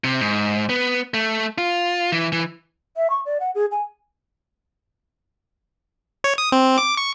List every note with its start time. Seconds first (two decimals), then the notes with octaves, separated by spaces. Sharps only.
0.04 C3
0.21 G#2
0.69 B3
1.14 A3
1.58 F4
2.12 E3
2.32 E3
2.97 E5
3.10 C#6
3.25 D5
3.40 F#5
3.55 G#4
3.72 G#5
6.24 C#5
6.38 D#6
6.52 C4
6.78 D6
6.97 C#6